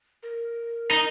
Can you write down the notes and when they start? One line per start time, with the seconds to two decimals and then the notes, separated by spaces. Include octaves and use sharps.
0.23 A#4
0.91 D#4